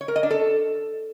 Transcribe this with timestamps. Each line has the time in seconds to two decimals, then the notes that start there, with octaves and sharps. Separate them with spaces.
0.01 C#5
0.08 A#4
0.16 D#5
0.23 D4
0.30 A4